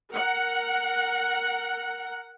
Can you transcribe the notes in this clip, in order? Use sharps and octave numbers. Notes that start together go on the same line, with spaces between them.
A#4 F#5